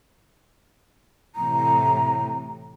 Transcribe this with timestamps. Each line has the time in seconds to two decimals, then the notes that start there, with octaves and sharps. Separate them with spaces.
1.35 A2 C3 E3 A#5